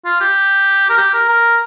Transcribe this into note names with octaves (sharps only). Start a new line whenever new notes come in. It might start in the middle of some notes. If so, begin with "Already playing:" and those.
F4
G4
A#4
G4
A#4
A#4